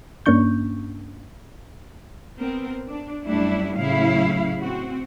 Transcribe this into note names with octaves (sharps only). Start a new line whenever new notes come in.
G2 A#3 C#4 D4 C#6 G6
B3 C4 A#4
D4
F#2 G3 A3 D4 E4
A2 C#3 F#3 E4 F5
C4 F#4